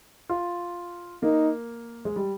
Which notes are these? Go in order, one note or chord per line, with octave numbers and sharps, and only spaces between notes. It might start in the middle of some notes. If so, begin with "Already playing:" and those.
F4
A#3 D#4
G#3
G3